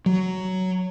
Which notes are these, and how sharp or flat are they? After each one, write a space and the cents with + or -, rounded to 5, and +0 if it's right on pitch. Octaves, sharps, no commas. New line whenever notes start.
F#3 +10